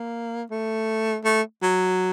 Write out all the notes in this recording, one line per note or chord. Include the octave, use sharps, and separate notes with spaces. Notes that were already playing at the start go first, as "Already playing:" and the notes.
Already playing: A#3
A3
A3
F#3